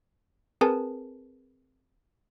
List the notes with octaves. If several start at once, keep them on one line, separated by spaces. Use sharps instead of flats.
C4 G#4 A#4 B4 G#5 A5